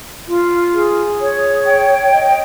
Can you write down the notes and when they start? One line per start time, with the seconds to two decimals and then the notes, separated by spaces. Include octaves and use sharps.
0.27 F4
0.73 G#4
1.19 C#5
1.65 G5
2.11 D#5